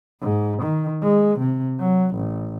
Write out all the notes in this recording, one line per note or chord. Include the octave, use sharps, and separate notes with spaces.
G#2
D#3
G#3
C3
F#3
A1